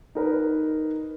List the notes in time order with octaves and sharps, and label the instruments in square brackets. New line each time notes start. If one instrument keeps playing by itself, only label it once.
[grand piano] D#4 A#4 B4